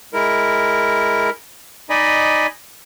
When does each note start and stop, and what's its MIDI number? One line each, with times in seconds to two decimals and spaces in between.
0.13 1.30 56
0.13 1.30 64
0.13 1.30 70
1.90 2.47 63
1.90 2.47 74
1.90 2.47 75
1.90 2.47 80
1.90 2.47 83